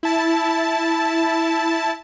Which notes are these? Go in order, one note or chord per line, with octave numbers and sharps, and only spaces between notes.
E4 A5